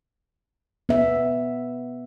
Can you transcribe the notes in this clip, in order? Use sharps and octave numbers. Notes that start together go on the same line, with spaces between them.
B3 E5